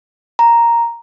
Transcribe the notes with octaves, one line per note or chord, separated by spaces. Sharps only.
A#5